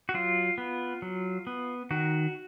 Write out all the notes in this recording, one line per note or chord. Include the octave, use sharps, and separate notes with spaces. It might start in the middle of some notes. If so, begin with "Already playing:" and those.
F#4
F#3 F4
B3
F#3
B3
D#3 F#4